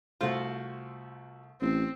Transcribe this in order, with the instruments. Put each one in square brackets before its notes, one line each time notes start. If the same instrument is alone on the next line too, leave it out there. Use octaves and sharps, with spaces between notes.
[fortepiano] C2 A3 C5 [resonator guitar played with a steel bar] F4 F#4
[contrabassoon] A1 [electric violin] C4